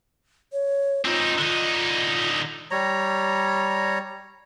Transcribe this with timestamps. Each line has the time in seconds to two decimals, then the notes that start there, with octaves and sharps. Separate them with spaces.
0.52 C#5
1.05 C4 D#4 F4
1.38 D3 D#4
2.71 G3 C#5 A#5